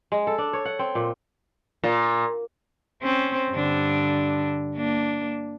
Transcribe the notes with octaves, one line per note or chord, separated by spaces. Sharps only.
G#3
A4
D4
C#5
F#5
C4
A#2
A#2
C4 C#4 C5
G2 D3 D4
A#3 D4